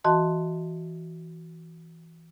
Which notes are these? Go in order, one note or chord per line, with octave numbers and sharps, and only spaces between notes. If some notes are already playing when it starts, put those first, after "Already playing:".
E3 F#4 D#5 A5 C6